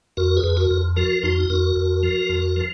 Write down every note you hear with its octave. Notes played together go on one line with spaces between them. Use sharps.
F2 F#4 A#4
G#4 B4
F2
F#4 A#4
F2
F3 F#4 A#4
F2 D#4 F#4
F2 F#4 A#4
F2
F3
F2
F3